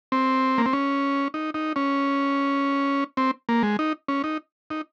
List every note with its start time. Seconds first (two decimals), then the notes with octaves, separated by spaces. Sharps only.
0.12 C4
0.58 A#3
0.66 C4
0.73 C#4
1.34 D#4
1.54 D#4
1.76 C#4
3.17 C4
3.49 A#3
3.63 G#3
3.79 D#4
4.08 C#4
4.24 D#4
4.70 D#4